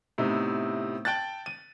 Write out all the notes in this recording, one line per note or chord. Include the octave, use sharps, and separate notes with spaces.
A2 C3 B3 D#4 E4
G5 A5 F#6 A6
D#7